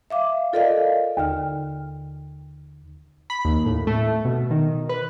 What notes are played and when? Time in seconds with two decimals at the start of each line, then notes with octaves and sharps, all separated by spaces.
0.10 E5 F5 D6
0.53 F4 A4 A#4 D5 D#5 F5
1.17 D#2 D3 F6
3.30 B5
3.45 D#2
3.66 A2
3.87 A3
4.25 B2
4.51 D#3
4.89 B4